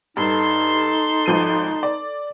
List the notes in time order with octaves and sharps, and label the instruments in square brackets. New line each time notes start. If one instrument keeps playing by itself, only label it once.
[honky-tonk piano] G2 [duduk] D#4 [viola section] A4 C6
[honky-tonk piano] G#1 F3 D#7
D5